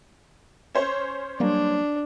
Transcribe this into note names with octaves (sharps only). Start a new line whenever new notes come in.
C#4 C5 C#5
F#3 G3 A#3 D4